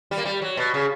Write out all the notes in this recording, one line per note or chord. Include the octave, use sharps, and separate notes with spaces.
G3
A#3
G3
F#3
B2
C#3